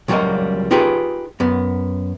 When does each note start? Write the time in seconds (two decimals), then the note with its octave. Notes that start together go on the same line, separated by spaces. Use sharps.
0.08 C#2 F#3 G3 A3 A#3 D#5
0.71 D#4 F4 G4 G#4 B4
1.40 F#2 B3